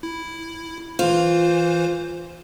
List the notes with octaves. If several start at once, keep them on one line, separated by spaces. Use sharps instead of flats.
E4
E3 F4 C5